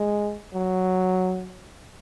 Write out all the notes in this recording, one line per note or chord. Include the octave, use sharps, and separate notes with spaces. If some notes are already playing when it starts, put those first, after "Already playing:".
Already playing: G#3
F#3